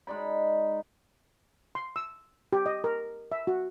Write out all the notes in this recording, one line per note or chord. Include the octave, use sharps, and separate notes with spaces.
G#3 D#4 D5 B5
C6
E6
G4
D#5
A#4
E5
F#4